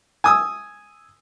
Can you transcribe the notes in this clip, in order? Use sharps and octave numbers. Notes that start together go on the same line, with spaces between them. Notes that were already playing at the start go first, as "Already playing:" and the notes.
G#5 D#6 E6